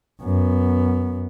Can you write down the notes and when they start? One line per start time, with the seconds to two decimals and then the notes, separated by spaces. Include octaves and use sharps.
0.21 F#2 B3